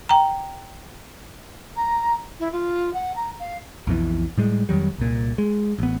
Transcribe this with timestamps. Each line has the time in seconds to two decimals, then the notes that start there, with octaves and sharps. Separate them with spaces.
0.09 G5 A#5
1.76 A#5
2.39 E4
2.52 F4
2.93 F#5
3.16 A#5
3.39 F5
3.87 B1 F2 B2 E3
4.37 A2 G3 G#3
4.69 F2 D#3 F#3 G3
4.98 C2 A#2
5.38 G#3
5.78 A1 B3